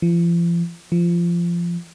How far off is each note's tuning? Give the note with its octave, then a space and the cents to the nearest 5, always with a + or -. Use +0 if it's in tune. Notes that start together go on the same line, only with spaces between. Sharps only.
F3 -40
F3 -20